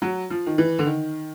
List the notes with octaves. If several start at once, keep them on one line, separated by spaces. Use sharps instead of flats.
F#3
F3
D#3
E3
D3
D#3